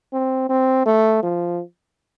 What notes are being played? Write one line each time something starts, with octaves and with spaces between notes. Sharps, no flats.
C4
C4
A3
F3